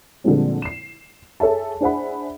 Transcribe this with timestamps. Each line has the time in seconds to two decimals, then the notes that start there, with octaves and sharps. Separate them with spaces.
0.24 A#2 D3 F3 G3 G#3 C4
0.62 C7 E7
1.40 G#4 A4 C#5 E5 A5
1.81 D4 G#4 C5 E5 F#5 B5